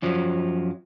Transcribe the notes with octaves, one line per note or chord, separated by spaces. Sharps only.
F#2 F3 F#3